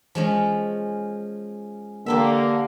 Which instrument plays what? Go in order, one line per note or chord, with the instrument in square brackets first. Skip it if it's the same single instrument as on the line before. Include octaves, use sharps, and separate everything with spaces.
[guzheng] F3 G#3 C#4
[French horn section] D3 A#3 [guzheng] G4 A4 E5